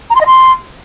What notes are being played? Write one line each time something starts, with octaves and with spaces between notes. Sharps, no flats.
A#5
C6
D#5
C6